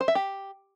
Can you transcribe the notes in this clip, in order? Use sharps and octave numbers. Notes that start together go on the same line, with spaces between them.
C5
E5
G4